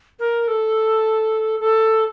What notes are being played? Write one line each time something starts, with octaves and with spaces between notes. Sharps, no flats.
A#4
A4
A4